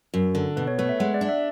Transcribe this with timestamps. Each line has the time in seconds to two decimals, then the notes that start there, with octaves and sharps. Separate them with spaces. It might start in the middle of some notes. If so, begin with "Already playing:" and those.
0.14 F#2 F#4
0.35 D3 A4
0.57 B2 B4
0.68 C#5
0.79 A3 B4
0.89 E5
1.00 G#3 F#5
1.14 D5
1.21 D4
1.29 E5